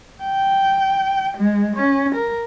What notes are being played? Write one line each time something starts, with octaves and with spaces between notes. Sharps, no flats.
G5
G#3
C#4
A#4